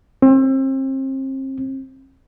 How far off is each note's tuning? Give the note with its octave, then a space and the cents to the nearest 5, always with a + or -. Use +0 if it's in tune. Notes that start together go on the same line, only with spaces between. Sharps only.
C4 +35